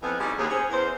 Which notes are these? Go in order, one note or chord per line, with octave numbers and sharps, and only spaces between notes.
F2 E3 F3 B3
G3 G#3 B3 C#4 D#4 E4
D#2 G#4
C#4 G#4 C5
E2 C5